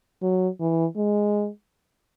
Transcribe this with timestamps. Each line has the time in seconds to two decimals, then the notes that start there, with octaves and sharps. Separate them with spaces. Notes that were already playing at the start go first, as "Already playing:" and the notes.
0.22 F#3
0.60 E3
0.96 G#3